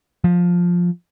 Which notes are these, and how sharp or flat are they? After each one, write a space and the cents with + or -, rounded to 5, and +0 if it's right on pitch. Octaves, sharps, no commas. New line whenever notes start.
F3 +10